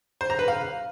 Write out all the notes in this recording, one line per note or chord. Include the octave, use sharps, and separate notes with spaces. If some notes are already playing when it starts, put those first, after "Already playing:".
C5
A#5
B4
F5